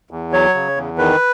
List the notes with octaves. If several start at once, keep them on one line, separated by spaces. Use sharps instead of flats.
E2
F#3 C#5
C#3
E2
D#3 B4